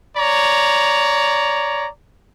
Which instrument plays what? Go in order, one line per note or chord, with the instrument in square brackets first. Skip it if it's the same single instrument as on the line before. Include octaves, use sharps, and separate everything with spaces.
[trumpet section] C#5 D5 A#5